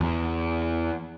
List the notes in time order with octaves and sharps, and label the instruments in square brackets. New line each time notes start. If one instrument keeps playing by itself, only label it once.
[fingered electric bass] E2